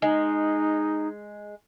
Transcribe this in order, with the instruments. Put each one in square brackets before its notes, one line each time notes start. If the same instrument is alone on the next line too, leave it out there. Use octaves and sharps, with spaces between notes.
[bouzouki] G#3 [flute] D#4